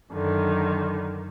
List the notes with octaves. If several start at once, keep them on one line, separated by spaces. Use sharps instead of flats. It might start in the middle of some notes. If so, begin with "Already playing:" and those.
F#2 D3 D#3